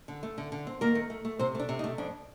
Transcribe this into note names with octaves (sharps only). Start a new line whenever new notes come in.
D3
A3
D3
D3
C4
D#3 A#3 A#4
A3
A3
A3
C3 C4 C5
A3 D4
C3
D#4
A3
F2 D4